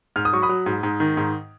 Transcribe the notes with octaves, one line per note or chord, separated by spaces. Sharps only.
G#2 F6
D#6
F#3 C#6
B5 D#6
F#3
G#2
G#2
D#3
G#2